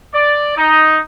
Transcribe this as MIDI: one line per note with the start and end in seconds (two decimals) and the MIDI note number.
0.14 0.53 74
0.56 0.97 63